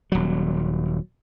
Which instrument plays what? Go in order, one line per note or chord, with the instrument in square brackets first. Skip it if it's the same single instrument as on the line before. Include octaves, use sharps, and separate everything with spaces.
[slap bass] D#1 F#3